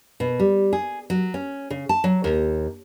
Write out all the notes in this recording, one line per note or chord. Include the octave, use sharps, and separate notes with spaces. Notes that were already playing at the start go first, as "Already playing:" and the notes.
B2
G3
G#4
F#3
C#4
C#3
A5
F#3
D#2